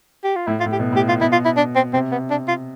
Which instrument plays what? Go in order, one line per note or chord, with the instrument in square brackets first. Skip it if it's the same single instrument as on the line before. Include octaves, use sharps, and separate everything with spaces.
[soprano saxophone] G4
F4
[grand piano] A2 [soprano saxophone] E4
[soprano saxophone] F4
[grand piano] A2
[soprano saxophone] G4
[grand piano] B2
A2
[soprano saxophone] G4
F4
[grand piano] B2 [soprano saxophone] E4
[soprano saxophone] F4
E4
D4
C4
[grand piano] C3 [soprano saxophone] C4
[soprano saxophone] B3
D4
F4